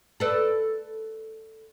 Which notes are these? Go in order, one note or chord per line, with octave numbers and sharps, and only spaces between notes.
A4 B4 D5